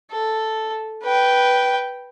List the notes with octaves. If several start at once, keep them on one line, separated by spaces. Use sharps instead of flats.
A4
B4 G5